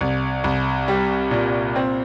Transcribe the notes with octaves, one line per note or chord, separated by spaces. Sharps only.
C2
C2
G3
A#2
C4